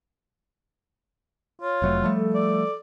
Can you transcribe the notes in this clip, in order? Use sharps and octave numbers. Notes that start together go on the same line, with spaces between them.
F4 C#5
F1 F#3 A3
F3 G3 A3
A4
D5